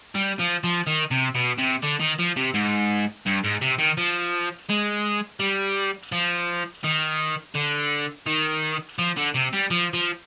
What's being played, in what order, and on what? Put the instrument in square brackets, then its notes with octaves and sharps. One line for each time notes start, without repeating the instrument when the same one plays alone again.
[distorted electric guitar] G3
F3
F3
D#3
C3
B2
C3
D3
D#3
F3
C3
G#2
G2
G#2
C3
D#3
F3
G#3
G3
F3
D#3
D3
D#3
F3
D3
C3
G3
F3
F3